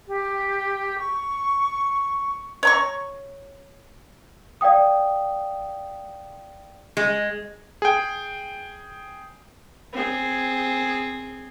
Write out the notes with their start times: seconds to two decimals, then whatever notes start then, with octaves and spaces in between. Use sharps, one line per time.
0.08 G4
0.98 C#6
2.63 C#5 A#5 C#6
4.61 D5 F5 G5 D#6
6.97 G#3
7.82 G#4 G5
9.93 C4 G#4